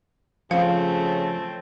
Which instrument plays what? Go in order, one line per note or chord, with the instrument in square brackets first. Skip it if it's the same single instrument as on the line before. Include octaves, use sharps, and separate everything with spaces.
[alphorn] C#3 [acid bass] F3 [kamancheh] A3 C4 [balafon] F5